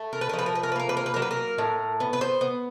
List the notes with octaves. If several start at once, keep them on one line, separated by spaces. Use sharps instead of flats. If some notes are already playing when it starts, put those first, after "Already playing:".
Already playing: A3
A#4
B4
A#4
F3
B4
A#4
B4
A#4
B4
A#3 A#4
B4
A#4
B4
F#3 A#4
B4
A#4
A2
B3
B4
C5
B3